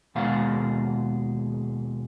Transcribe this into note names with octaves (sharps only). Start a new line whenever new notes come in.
D#2 B2 G#3 G#4 F5